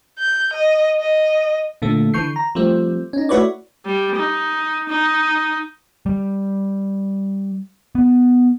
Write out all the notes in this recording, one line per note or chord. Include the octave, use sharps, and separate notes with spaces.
G6
D#5
D#5
A#2 D3 A3
D3 E3 C#6 G6 C7
A#5
F3 G3 A3 C4
C#4 D#4
A3 E4 F#4 B4 C#5 D5
G3
D#4
D#4
G3
B3